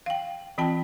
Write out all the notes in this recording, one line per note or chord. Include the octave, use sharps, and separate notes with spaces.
F5 G5
E3 C4 F4 G5 A5